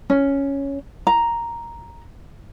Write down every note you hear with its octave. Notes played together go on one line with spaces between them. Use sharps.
C#4
A#5